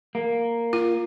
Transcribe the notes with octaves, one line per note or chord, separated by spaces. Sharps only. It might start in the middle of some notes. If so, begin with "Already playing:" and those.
A#3
F4